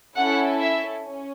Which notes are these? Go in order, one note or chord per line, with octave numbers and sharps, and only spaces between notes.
C#4 E4 A4 F#5
E5
C#4